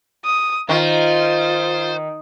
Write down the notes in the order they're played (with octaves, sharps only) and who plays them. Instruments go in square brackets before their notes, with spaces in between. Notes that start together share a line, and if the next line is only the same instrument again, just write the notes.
[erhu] D#6
[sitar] D#3 [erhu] F4 [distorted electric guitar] C5